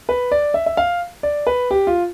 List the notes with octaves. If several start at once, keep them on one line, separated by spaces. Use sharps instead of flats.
B4
D5
E5
E5
F5
D5
B4
G4
F4